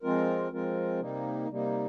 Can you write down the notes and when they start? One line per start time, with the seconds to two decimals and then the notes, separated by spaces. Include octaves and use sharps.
0.03 F3 G#3 C4 F4 A#4
0.52 F3 G#3 C4 F4 A#4
1.00 C3 G3 A#3 D#4
1.49 C3 G3 A#3 D#4